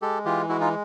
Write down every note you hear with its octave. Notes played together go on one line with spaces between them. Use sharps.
G#3 G4 A4
E3 F4 G4
G#3 E4 F#4
D#4 F4